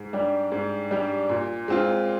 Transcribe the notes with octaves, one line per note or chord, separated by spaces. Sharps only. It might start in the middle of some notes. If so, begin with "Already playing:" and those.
Already playing: G#2
G3 D4 G4
G#2
G3 D4 G4
A#2
G#3 C4 F4